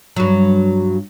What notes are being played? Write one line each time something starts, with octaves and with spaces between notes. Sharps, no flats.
G2 F#3